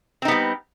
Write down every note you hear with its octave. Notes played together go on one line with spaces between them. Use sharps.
G3 B3 C4 D#4